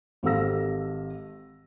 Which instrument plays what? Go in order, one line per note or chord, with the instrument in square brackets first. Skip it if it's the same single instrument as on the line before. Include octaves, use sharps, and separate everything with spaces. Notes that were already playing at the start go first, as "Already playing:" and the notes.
[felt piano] G#1 G4 A4 F5 E6 A#6